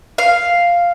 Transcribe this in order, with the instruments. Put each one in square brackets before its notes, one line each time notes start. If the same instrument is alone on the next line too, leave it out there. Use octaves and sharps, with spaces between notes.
[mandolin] F5